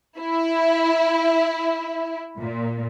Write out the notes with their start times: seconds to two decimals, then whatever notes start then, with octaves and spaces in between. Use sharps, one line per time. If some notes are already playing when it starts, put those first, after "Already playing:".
0.19 E4
2.39 A#2